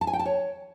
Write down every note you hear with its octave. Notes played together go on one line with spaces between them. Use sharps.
A5
G#5
G5
A5
C#5